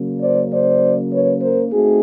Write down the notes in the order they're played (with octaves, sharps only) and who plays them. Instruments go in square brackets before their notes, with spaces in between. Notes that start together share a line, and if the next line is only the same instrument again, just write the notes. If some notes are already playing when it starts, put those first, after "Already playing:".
Already playing: [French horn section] C#3 F#3 A#3 C#4
C5 D5
C5 D5
B4 C#5
A#4 C5
A3 C4 D#4 F#4 G#4